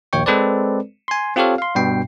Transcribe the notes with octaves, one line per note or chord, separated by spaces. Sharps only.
A#1 D#2 C#5 G5 C#6
G#3 C4 A4 B4 C5 D5
G#5 C6
C4 F4 G4 A4 C#5 F5
F5 C6
G2 B2 G5 C7